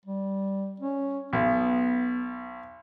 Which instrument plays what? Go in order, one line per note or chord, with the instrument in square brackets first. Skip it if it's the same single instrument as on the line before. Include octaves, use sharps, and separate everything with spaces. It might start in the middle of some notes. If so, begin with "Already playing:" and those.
[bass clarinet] G3
C#4
[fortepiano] B1 [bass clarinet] B3